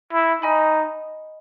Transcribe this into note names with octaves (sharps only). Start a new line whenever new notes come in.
E4
D#4 D#5 G#5 B5